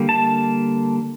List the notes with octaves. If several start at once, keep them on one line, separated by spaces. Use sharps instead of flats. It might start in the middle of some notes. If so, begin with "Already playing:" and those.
Already playing: D3 G3 A#3
A5